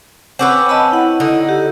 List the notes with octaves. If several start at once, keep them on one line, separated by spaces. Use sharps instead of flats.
C4 C#4 B4 F#5 D6 E6
D#5 A5 B5
E4 F#5
D3 D#4
G4